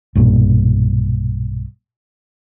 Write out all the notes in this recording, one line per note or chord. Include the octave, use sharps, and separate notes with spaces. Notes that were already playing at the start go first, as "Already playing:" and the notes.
B1 G2 A#2